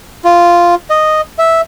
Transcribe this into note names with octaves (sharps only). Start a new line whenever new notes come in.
F4
D#5
E5